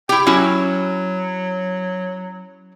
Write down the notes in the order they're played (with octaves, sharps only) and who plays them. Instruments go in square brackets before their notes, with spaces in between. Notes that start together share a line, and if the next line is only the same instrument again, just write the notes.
[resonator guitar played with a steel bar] E4 G4 [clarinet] G5
[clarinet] F#3 [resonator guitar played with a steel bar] C#4 E4 F#4